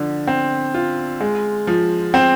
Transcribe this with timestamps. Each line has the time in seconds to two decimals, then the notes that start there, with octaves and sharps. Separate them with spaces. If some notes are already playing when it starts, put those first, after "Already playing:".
Already playing: D3 F3
0.27 C4
0.74 F4
1.20 G#3
1.67 F3
2.14 C4